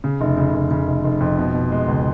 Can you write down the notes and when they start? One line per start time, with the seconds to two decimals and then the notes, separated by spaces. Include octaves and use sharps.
0.04 C#3
0.21 F1
0.37 C#3
0.54 F1
0.71 C#3
0.88 F1
1.04 F1
1.21 F2
1.38 B2
1.55 B2
1.72 G#3
1.88 C#2